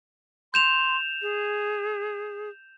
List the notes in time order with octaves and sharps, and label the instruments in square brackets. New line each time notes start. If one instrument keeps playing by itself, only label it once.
[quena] C6 [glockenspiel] G6 E7 F7
[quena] G#4